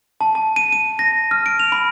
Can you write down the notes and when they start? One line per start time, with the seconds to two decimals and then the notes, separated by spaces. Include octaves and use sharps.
0.21 A5
0.35 A5
0.56 D#7
0.72 D#7
0.99 A#6
1.31 F6
1.46 D7
1.60 F7
1.72 B5